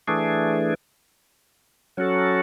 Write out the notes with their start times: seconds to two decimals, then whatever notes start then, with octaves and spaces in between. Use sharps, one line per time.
0.08 E3 A3 D4 G#4
1.97 F#3 C#4 F#4 A4